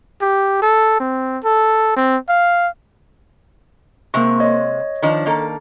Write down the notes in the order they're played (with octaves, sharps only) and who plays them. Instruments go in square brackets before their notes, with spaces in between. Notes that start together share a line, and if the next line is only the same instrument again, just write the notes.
[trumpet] G4
A4
C4
A4
C4
F5
[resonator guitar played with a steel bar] C3 G#3 C4 [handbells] A#3 C#6
[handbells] C#5 D#5
[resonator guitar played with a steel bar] D#3 F3 D4
D#3 A#3 A4